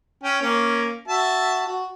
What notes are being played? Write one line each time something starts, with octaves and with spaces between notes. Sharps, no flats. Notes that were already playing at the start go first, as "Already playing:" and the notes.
C#4 G5
A#3 C#4
F#4 E5 A5
F#4